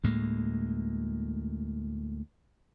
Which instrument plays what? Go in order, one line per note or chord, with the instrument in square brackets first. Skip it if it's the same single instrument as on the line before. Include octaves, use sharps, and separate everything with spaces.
[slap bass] D2 A2 G#3 A#3